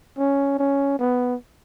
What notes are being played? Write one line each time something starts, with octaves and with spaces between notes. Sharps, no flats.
C#4
C#4
B3